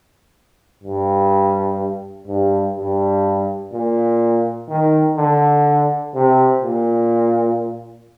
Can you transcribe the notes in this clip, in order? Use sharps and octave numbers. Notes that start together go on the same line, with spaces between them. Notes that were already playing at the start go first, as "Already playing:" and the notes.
G2
G2
G2
A#2
D#3
D3
C3
A#2